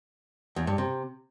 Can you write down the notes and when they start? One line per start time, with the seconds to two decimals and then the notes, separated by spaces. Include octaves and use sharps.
0.56 E2
0.67 G2
0.78 C3